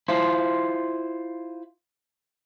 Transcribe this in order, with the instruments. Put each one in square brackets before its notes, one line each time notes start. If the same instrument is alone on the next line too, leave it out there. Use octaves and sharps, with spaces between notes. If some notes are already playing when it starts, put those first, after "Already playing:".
[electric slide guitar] E4 F4 C5